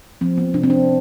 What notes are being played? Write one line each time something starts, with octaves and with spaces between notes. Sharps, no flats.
F3 C4
B3
C3 D4
C4
D4